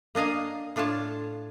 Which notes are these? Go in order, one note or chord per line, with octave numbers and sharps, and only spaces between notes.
A#3 D4 D#5 F5 G#5
A2 D4 F4 C#5 A5